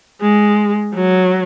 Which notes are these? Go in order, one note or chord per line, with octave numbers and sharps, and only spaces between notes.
G#3
F#3